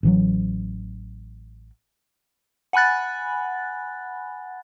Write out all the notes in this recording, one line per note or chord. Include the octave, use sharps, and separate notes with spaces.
A1 E3 F#3
F#5 G#5 B5 F#6 A6